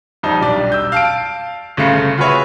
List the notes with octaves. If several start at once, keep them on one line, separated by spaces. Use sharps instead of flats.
F2 G3 D#4 A5
B1 G3 D4 D5
E6 G6
F5 A5 D7
G1 C#3 A3 F5 C#7
F4 F#4 G#4 B4 C#5 E5